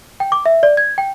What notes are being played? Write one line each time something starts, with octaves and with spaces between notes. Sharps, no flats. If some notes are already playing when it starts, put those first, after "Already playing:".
G5
D6
E5
D5
G#6
G5